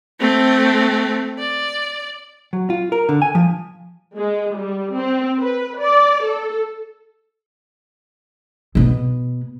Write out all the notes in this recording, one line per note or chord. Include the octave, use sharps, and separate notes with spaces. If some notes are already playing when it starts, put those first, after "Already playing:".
A3 C4
D5
F#3
F4
A#4
D3
G#5
F3
G#3
G3
C4
B4
D5
A4
B2 B3